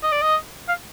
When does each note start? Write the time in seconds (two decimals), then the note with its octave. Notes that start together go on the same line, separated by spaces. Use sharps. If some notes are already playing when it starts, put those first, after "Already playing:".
0.03 D#5
0.12 D5
0.22 D#5
0.68 F5